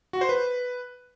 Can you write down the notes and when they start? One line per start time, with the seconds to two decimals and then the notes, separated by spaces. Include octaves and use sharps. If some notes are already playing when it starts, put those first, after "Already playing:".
0.13 F#4
0.21 C5
0.29 B4